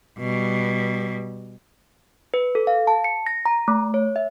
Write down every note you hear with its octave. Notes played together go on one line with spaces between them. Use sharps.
B2 G3
B4
A4
F5
A5
C#7
A#6
A#5
A3
C#5
E5